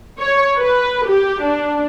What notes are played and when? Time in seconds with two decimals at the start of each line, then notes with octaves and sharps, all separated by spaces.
0.19 C#5
0.59 B4
1.07 G4
1.42 D4